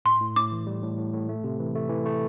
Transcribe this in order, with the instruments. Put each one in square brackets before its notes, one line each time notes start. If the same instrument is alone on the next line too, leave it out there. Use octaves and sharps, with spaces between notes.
[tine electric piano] A2 [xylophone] C6
[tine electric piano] A2
[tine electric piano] A2 [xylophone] D6
[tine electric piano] E3
G3
A2
A2
A2
A3
C3
E3
A3
E3
A3